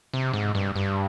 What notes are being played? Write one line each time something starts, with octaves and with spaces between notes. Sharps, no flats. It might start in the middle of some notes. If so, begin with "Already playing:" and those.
C3
G#2
G2
G2